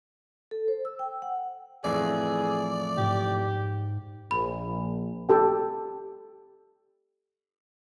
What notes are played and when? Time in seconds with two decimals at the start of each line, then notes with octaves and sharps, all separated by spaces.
0.51 A4
0.68 C5
0.85 E6
0.99 G5
1.22 F#5
1.85 F2 A2 E3 G#4 D5
2.98 G#2 G4
4.31 A#1 B5
5.29 G4 A4 G5